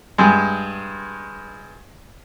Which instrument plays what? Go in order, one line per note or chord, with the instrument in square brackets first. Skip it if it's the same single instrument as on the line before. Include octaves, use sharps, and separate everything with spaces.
[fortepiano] G2 G#3